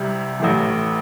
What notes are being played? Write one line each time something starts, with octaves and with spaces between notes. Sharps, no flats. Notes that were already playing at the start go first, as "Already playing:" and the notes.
Already playing: C2 C3 G3
A1 A2 E3